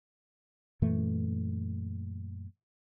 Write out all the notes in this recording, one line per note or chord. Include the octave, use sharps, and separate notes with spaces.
F#2 A#2 E3 A3